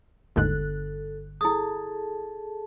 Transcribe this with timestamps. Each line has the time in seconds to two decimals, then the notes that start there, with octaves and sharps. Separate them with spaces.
0.36 G1 D#2 G#2 D3 A4 F#6
1.41 E4 G#4 A4 A5 D#6